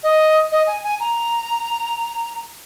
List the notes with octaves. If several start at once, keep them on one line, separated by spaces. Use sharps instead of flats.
D#5
D#5
G#5
G#5
A#5